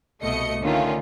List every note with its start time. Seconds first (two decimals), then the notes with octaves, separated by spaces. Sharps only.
0.22 C2 B2 A3 D#5 C#7
0.62 D3 D#3 A3 C#4 F4